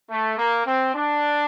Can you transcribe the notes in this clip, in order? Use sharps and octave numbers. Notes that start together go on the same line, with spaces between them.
A3
A#3
C4
D4